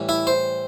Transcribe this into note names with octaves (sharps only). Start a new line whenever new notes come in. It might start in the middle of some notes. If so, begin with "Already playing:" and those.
Already playing: A2 E3 G3
E4
C5